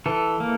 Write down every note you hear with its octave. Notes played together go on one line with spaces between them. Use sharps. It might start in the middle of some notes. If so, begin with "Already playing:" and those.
E3 A4
A#3